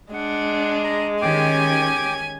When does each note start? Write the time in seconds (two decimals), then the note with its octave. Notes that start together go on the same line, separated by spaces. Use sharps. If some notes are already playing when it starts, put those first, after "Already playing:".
0.13 G#3 D4 F#5
0.84 A#5
1.22 D#3 C#4 G4 G5 G#5 D6